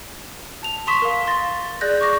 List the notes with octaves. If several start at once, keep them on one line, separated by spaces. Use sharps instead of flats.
A5 F7
C6 C#6 D#6 B6 E7
A#4 F5
C6 A6 A#6
G#4 D5 F#6 G6 A#6
C#6 D6 A#6